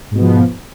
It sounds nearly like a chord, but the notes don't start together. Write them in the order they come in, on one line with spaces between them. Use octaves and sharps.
G#2 B2 B3 F3